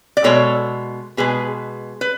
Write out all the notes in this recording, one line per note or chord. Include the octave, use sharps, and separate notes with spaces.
D5
B2 G#3 A4 C#5
B2 G#3 G#4 B4
B4